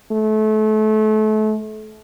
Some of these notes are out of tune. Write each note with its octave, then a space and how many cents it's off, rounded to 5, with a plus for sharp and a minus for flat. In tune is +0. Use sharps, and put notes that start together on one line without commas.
A3 -30